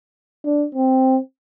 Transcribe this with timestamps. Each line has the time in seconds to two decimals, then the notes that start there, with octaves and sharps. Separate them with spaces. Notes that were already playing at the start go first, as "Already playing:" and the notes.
0.44 D4
0.75 C4